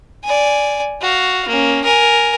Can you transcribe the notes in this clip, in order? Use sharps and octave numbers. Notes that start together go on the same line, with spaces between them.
D5 G#5
F#4 F5
A#3 C#4
A#4 G#5